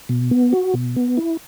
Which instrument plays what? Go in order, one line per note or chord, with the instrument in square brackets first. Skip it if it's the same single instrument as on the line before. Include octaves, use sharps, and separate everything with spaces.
[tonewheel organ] B2
B3
F#4
B2
B3
E4